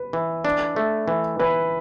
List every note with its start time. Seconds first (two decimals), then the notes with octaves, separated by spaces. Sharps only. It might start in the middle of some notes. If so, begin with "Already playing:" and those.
Already playing: B4
0.13 E3
0.45 D4
0.76 A3
1.08 E3
1.39 E3 B4